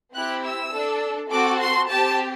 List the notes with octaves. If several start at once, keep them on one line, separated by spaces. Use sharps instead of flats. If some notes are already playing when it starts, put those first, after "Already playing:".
C4 E4 G4 F#6
E6
D4 A4
C4 F#4 A4 D6
C6
C4 G4 A5